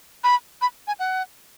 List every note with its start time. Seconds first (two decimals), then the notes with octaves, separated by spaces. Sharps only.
0.24 B5
0.62 B5
0.87 G#5
0.99 F#5